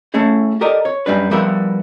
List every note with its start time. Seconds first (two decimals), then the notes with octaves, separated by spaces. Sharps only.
0.14 A3 C#4 E4 G#4
0.61 G4 A4 A#4 D5 D#5
0.85 C#5
1.06 F#2 G3 D4 B4
1.31 F3 G3 B3 E4 A#4 E5